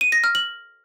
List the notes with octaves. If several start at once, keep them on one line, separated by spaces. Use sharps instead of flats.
D#7
A#6
F6
F#7